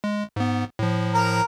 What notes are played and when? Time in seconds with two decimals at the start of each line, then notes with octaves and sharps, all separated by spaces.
0.04 G#3
0.36 G#2 B3
0.79 A2 F3
1.14 A#4 A#5